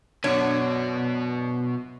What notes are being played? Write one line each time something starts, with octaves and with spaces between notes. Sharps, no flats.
F#2 B2 D4 F#4 C#5